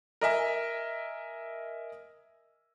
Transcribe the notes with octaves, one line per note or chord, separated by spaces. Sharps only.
A#4 D#5 E5 G#5